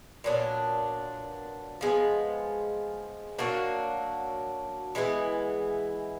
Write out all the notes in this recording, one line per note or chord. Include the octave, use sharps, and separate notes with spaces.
A#2 F#3 B3 D4
F3 G#3 B3
F#3 A#3 D4 F#4
E3 G#3 B3 E4